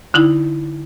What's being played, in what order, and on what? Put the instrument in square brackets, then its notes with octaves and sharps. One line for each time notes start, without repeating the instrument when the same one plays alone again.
[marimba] D3 D#4 E4